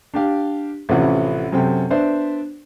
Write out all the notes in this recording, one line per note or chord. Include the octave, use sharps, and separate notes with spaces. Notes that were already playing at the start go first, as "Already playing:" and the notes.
D4 G4 F5
A1 C3 E3 F3 C#4 F#5
F#2 C3 A4 G5
B3 D4 C5 D5 E5